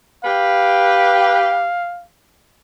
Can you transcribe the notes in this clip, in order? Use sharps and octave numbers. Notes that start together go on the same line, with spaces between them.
G4 B4 F5